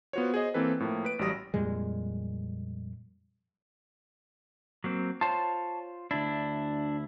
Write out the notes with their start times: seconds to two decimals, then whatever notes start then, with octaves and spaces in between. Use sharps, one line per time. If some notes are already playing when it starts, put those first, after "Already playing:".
0.13 B3 F4 F#4 C5 C#5
0.34 G#4 C5 D#5
0.54 E3 A#3 C4 A4 B4
0.80 A2 F3 A#3
1.05 B4 D7
1.19 A1 F#3 G3 D#6 A#6
1.54 F2 A#2 G3 G#3
4.84 F#3 A#3 C4
5.21 F4 C5 C#5 A5
6.11 D2 D4 E4